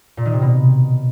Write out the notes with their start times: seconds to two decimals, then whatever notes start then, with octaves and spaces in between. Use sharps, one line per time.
0.17 A#2
0.25 D#3
0.34 C3
0.42 B2